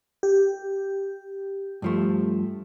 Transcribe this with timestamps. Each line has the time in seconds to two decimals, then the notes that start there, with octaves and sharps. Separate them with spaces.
0.23 G4
1.82 G2 F3 A3